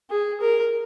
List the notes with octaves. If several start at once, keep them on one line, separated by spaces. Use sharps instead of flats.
G#4
A#4